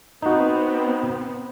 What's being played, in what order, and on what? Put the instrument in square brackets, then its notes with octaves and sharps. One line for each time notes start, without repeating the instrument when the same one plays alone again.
[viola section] B3 C4 [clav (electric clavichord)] D#4 F#4